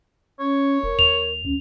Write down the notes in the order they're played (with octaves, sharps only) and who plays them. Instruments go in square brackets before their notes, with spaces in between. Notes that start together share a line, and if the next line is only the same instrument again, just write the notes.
[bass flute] C#4 [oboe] C#5
[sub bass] E1 [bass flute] A#4
[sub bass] D#2 [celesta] F7
[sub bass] D2 [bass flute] C#4